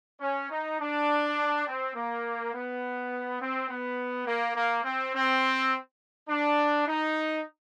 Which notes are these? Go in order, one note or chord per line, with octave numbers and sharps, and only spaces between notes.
C#4
D#4
D4
C4
A#3
B3
C4
B3
A#3
A#3
C4
C4
D4
D#4